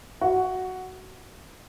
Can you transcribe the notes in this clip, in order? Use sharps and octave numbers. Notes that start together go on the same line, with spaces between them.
F#4